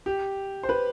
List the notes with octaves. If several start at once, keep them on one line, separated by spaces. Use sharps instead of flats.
G4
C5
B4